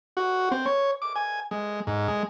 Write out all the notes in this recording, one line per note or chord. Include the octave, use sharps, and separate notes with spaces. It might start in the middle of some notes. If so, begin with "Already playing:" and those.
F#4
C4
C#5
D6
G#5
G#3
G#2
G#3